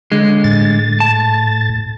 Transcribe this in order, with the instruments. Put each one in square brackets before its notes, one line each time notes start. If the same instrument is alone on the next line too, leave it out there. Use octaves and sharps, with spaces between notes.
[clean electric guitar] D3 G#3
[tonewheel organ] A2 A6
[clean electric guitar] A5